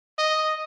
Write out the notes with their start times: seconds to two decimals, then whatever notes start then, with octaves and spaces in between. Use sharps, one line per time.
0.19 D#5